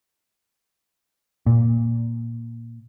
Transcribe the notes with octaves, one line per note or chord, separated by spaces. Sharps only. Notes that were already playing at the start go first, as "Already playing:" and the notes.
A#2